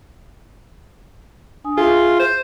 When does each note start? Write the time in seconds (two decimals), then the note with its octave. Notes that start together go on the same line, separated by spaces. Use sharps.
1.64 D4 G#5 D#6
1.78 F4 G#4 E5 C6
2.20 C5